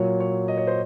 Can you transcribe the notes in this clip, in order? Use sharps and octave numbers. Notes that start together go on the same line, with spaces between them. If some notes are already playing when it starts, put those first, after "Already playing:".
Already playing: A#2 F#3 C#5
C#5
D#5
C#5
C5